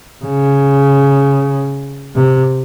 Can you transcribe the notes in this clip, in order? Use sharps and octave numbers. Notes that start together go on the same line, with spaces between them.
C#3
C3